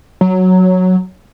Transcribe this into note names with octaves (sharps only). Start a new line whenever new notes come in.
F#3